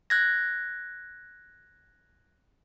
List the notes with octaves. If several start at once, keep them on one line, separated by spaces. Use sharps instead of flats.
F#6 G#6 A#6